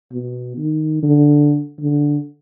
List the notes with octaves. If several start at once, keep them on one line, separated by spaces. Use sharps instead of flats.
B2
D#3
D3
D3